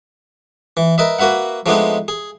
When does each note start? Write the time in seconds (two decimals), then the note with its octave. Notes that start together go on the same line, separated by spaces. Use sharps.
0.77 E3
0.98 A#4 B4 D#5 E5
1.19 A#3 F#4 B4 E5 F#5
1.66 F3 G#3 A3 B3 D4 D#4
2.08 G#4